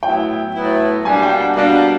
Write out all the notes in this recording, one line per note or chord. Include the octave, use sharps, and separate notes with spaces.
A2 F#3 B3 E4 G5
A2 F#3 B3 E4
B2 G3 A#3 D4 G#5
G5
F#5
B2 G3 A#3 D4 F5